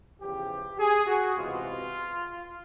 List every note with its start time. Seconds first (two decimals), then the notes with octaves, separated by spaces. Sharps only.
0.21 E2 C#3 F3 G4
0.79 G#4
1.06 F#4
1.35 C#2 C3 E3 G#3 B3 F4